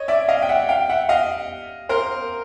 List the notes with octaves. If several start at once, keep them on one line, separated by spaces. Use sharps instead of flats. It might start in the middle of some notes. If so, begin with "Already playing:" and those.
Already playing: C#5 D#5
D5 E5
D#5 F5
G5
E5 F#5
F5 G5
E5 F#5
D#5 F5
A#4 C5